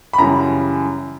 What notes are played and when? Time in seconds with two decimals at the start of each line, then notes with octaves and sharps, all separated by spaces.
0.13 B5
0.18 F#2 C#3 E3 G3 A#5